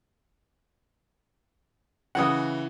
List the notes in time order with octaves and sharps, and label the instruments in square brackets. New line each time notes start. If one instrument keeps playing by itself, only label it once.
[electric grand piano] C#3 E3 [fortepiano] F#5 D#6